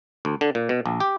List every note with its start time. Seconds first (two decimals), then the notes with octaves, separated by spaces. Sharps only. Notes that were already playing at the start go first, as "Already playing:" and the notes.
0.25 D2
0.41 D3
0.55 A#2
0.69 B2
0.86 A#1
1.00 G4